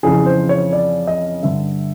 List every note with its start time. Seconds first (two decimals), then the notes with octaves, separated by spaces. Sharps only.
0.03 F2 C#3 E3 G#4
0.26 C5
0.49 C#5
0.73 D5
1.07 D#5
1.43 G2 D3 E5